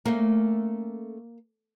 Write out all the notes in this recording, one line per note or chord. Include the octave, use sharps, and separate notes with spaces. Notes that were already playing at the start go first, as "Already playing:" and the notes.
A3 A#3 C#4 A#4